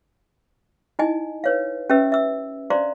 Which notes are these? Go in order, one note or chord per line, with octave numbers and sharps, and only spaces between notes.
D#4 E4 D#5 G#5
B4 C#5 F5
C#4 G4 B4 E5 E6
E5 E6
D4 C5 D5 F5 A#5 C6